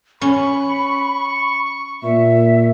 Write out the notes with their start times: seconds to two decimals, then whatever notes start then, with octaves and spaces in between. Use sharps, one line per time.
0.21 C#4 B5 C#6
2.03 A#2 E5